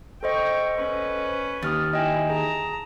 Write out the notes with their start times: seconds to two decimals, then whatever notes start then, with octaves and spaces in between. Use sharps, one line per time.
0.23 A4 C5 D#5 G5 C#6
0.77 C#4 B4
1.62 D#2 D#6 F6 A6
1.93 E4 D#5 G5 G#5
2.30 G#4 A5 A#5